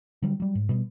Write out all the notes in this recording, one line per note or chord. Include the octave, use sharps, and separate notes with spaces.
D3 F#3 G3
F#3 G3
G#2
B2 G3 B3